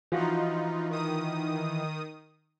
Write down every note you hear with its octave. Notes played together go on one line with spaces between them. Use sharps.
E3 F3 D#4 F4 F#4
D#3 D#6